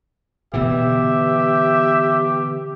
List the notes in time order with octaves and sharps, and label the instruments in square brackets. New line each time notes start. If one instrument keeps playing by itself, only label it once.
[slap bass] B2 D3 E3 [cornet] G4 [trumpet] E5